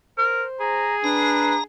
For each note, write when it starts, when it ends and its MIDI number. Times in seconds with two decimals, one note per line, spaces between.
0.18 0.44 70
0.18 0.90 72
0.60 1.61 68
0.60 0.96 82
1.04 1.59 62
1.04 1.55 71
1.04 1.64 82